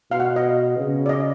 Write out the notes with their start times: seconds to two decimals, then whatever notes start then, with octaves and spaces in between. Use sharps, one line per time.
0.11 B2 F5
0.20 F#5
0.36 D#5
0.77 C#3
1.06 D5
1.09 D#5